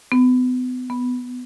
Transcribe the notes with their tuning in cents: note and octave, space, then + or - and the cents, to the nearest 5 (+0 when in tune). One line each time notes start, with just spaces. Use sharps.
B3 +35
B3 +10